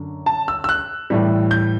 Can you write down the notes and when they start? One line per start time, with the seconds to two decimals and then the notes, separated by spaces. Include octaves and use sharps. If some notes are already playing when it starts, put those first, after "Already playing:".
Already playing: F#2 D3
0.26 A5
0.48 E6
0.64 E6
0.69 F#6
1.10 A2 E3 G3
1.51 G6